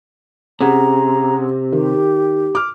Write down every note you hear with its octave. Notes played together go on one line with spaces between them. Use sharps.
C3 C#4 G#4 F#5 A#5
D#3 G4
D6 F6